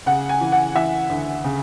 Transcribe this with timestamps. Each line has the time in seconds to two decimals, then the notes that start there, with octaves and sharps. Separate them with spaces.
0.06 C#3 F#5
0.29 G#5
0.41 E3
0.52 F#5
0.75 E3 E5
1.10 D2
1.44 C#3